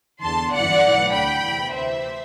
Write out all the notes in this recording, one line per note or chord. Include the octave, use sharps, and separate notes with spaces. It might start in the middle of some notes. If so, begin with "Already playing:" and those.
E2 D3 A5 C6
G1 F#2 E3 D5 F#5
B1 A2 E3
D2 D3 G5 B5
E2 C3 E3
D2 C3 E3 C5 E5